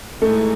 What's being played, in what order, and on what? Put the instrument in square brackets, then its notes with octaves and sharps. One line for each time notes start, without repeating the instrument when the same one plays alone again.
[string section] A2 E3 G#3 D#4 [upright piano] A3